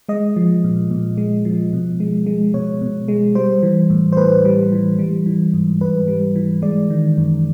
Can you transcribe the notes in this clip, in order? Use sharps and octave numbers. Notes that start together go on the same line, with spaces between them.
G#3 D#5
F3
A#2
A#2
G#3
F3
B2
G#3
G#3
B2 C#5
B2
G#3
G3 C5
E3
A2
C5
A2 B4
G3
E3
G3
E3
G#2
G#2 B4
G3
E3
G#3 D5
D#3
F#2